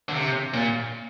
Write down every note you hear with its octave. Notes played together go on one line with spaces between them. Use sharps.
D3
C3
A#2